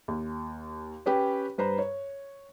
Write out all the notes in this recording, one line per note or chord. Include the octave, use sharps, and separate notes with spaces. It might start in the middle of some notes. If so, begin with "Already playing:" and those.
D#2
C#4 G4 B4 C#5
G2 B4 C5 A#5
C#5